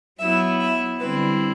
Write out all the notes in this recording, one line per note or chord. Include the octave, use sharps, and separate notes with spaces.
F#3 B3 E4 E5
E5
D3 G3 C4 E4 B4